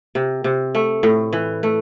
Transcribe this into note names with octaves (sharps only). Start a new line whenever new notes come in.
C3
C3
A3
A2
E3
A3